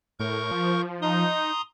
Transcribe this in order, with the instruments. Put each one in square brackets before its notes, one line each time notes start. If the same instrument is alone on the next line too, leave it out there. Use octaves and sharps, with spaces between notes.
[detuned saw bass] A2 [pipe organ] A#4 C#6 G6
[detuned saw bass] F3
[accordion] D#4 [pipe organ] A#5 C6 D#6